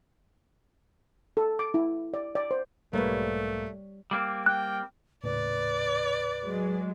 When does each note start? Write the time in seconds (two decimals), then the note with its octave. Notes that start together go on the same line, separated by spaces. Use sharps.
1.37 A4
1.59 D6
1.74 E4
2.14 D5
2.35 D5
2.51 C5
2.93 B1 G#2 G3 A3 A#3 B4 C#5
4.11 G3 A#3 C4
4.46 G5 F#6
5.24 D#1 A2 C#3 B4 D5
6.47 F#3 G#3